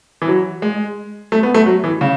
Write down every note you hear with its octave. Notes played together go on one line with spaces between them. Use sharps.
E3
F#3
G#3
A3
B3
A3
F#3
E3
C#3